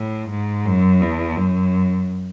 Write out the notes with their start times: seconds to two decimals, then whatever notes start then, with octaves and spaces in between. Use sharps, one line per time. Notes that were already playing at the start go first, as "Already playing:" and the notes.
Already playing: A2
0.30 G#2
0.66 F#2
1.01 E2
1.37 F#2